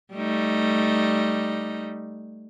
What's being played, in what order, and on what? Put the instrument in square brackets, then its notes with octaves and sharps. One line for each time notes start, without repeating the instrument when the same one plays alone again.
[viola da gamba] G3 A3 D#4